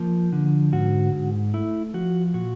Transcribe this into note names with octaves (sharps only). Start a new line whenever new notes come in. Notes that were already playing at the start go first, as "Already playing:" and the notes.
Already playing: F3 A#3
D3
G#2 F#4
G#2
A3 E4
F3 F#4
A#2 F#4